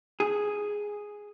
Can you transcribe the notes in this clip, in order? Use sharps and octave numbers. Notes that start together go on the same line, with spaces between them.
G#4